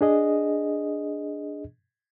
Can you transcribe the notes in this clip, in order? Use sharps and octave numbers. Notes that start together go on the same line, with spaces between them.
D4 G#4 D#5